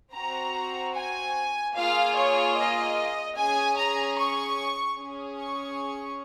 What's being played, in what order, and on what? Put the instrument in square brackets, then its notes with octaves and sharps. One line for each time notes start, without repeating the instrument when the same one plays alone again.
[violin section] C4 F#4 A#5
G#5
A#3 F4 G#4 F5
C#5
D#5
C#4 G#4 G#5
A#5
C#6
C#4 G#4
C#6